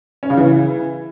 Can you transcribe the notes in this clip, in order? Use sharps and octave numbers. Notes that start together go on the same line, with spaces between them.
C#4
C#3
E3